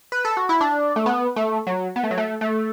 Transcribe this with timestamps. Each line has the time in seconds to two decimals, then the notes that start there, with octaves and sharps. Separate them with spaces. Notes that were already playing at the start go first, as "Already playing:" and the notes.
0.12 B4
0.25 A4
0.37 F#4
0.49 E4
0.61 D4
0.96 A3
1.06 B3
1.36 A3
1.67 F#3
1.96 B3
2.03 A3
2.11 F#3
2.18 A3
2.41 A3